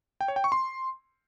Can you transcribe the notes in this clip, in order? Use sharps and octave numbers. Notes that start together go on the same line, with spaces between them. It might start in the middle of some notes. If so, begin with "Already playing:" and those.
G5
C#5
G5
C#6
C6